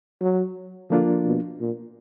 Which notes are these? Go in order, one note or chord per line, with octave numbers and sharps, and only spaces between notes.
F#3
D3 F3 A#3 D4 F4
B2
A#2